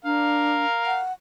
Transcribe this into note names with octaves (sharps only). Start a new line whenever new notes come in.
D4 A#4 F5
F#5